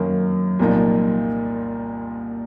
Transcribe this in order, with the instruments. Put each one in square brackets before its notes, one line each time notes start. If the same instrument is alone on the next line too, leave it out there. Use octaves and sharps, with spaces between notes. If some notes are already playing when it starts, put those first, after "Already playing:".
Already playing: [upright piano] F#2 D#3 A#3 [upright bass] F#3
[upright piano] C2 A#2 F3 A#3 D#4